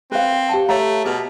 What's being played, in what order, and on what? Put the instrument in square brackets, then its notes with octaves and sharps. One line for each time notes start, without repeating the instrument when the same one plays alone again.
[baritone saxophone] C4 [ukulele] B4 F5
[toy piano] G4 G5 A5
[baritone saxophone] A3 [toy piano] C#5 F5 [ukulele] A#5
[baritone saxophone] B2 [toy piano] G#4 B4